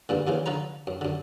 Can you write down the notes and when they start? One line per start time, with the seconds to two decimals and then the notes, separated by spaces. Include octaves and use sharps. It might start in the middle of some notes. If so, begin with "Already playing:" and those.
0.09 E2 G2 A#2 D3
0.27 D#2 A#2 C#3 E3
0.46 D3 F3 B4 A#5
0.87 F#2
1.01 F#2 D3